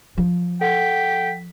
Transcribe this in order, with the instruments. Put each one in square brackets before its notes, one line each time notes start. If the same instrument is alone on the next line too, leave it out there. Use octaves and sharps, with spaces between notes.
[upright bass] F3
[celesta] A4 F#5 [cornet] G5 [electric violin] B6